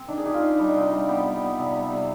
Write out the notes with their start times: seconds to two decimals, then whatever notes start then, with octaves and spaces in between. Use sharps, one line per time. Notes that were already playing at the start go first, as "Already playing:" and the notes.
Already playing: C4
0.08 D#3 D4
0.18 G#4
0.25 D#3 G4
0.34 F4
0.42 D#3 D#4
0.59 G3 D4
0.68 D#4
0.75 C3 F4
0.91 G3
1.08 B3 G4
1.25 G3
1.42 B3
1.59 C3
1.75 G3
1.92 C3